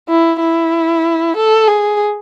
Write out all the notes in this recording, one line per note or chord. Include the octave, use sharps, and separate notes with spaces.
E4
E4
A4
G#4